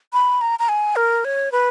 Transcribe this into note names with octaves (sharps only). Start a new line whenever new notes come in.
B5
A#5
A#5
G#5
A#4
C#5
B4